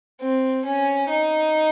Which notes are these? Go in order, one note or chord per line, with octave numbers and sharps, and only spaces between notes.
C4
C#4
D#4